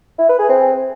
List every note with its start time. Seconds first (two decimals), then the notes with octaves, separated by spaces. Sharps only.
0.19 E4
0.29 B4
0.39 G#4
0.49 C4